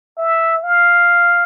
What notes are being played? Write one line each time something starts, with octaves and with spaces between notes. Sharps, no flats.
E5
F5